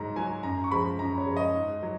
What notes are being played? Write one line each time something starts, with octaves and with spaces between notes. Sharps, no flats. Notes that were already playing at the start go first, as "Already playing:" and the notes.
Already playing: G#2 F#3 A#5
F#3 G#5
F#2 A#5
C#6
F3 G#3 B5
F#2 A#5
C#5
F3 G#3
D#5
G#2
F#3